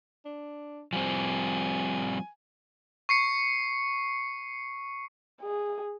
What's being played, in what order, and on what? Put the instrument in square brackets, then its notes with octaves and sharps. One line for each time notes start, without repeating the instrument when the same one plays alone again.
[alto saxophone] D4
[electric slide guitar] F3 G3 C4 [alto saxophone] G#5
[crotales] C#6 C7 C#7
[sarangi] G#4